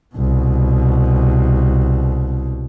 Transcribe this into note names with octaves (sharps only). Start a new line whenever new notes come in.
C2 B2